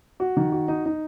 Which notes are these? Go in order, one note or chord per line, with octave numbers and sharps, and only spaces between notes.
F#4
D#3
F#4
D#4
D#4